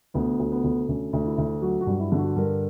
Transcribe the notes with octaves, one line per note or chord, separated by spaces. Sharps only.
D2 B3
D2
B3
D2
D2 C#4
D2
E4
D2
F#3 F#4
F#4
G2
E4
D3
F#4
G2 A#4